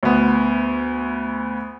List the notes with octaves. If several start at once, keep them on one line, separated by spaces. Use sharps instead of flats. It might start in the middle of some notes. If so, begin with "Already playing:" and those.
D2 B3